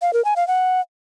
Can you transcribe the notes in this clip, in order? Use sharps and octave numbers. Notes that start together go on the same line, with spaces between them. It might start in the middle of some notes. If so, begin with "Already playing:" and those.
F5
A#4
G#5
F5
F#5